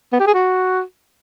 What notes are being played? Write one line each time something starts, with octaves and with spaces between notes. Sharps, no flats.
B3
G4
G#4
F#4